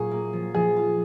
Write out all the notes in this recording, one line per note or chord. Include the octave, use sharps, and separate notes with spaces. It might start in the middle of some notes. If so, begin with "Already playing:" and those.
Already playing: A#2 F#3 C#4 F#4 G#4
A#3
F3
F3 G#4
F4